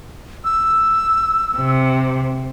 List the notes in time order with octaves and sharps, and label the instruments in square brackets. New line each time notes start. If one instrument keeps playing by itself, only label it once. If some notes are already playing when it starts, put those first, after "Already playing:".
[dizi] E6
[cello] C3